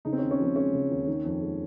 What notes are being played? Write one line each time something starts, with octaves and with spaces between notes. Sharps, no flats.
C#3 D#4
C4
C#4
D#2
C#4
F3 C4
G#3 C#4
C#3
D#2
D#3
F2
G#3